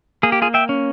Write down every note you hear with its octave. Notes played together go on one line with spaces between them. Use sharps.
A#3 G#4
G4
F4 G#4
E5 G5
C#4